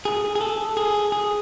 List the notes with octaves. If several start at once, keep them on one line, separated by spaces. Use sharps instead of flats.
G#4
G#4
A4
G#4
G#4